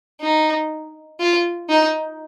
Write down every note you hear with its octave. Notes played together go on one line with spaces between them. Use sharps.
D#4
F4
D#4